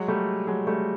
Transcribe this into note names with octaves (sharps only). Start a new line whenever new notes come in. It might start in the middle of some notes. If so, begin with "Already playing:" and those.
Already playing: F#3 G#3
G3 A3
F#3 G#3
G3 A3